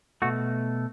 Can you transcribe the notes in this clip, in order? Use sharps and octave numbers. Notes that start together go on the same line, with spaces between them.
B2 A3 F#4